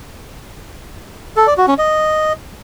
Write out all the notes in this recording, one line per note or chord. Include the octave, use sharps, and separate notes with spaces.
A4
D5
F#4
C#4
D#5